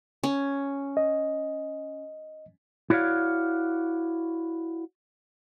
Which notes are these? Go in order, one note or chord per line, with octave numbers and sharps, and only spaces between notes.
C#4
D#5
E4 F#4 C#5 D5 F5